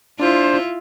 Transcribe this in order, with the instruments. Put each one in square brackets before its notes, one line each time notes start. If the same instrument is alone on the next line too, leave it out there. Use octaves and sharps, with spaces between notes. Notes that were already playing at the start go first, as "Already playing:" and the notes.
[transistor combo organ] D4 [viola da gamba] E4 F4 [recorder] C5